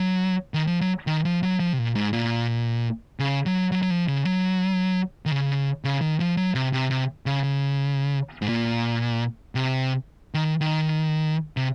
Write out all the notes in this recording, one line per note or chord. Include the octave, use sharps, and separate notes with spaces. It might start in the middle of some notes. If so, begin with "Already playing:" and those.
Already playing: F#3
D#3
F3
F#3
D#3
F3
F#3
F3
C3
A#2
G#2
A#2
C#3
F#3
F#3
F#3
F3
C#3
F#3
D#3
C#3
C#3
D#3
F3
F#3
C3
C3
C3
C#3
C#3
G#2
A#2
C3
D#3
D#3
C3